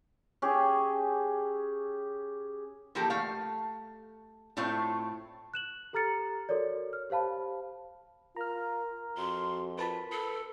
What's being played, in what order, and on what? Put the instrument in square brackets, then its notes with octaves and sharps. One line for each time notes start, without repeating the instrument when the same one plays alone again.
[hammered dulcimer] C#4 G4 G#4
[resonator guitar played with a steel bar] E3 F3 A#3 G4 A4 A#4
A3 F5
A2 A3 C4 F4 C#5
[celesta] F#6 E7 F#7
G4 A4 A#5 F6 A6 C#7
F#4 A4 A#4 C#5 D5
F6
G4 C5 F5 A5 B5
[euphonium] F4 [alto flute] A#4 [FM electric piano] A#5 F6
[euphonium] F2 [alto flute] F#4 [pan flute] C6
[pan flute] F4 [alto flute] A#4 [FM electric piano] B4 A5 B5
[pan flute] A4